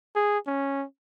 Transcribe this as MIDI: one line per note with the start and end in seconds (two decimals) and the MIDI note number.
0.16 0.39 68
0.47 0.85 61